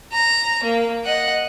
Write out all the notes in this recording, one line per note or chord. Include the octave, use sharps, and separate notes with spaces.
A#5
A#3
D#5 F#5